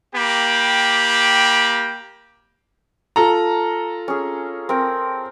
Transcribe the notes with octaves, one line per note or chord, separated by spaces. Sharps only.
A#3 G4 G5 B5
F4 A4 A#5
C#4 G#4
C4 A#4